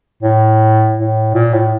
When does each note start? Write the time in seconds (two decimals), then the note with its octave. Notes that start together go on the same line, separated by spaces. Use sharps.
0.23 A2
0.97 A2
1.34 A#2
1.53 A2